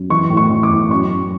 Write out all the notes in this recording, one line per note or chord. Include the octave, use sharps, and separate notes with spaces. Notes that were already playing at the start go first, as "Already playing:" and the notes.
Already playing: F#2
E3 C#6
A2
C#6
E3
D6
A2
F#2 C#6
F#2